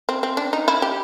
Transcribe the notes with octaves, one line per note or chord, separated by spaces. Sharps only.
C4
C4
D4
D#4
E4
G4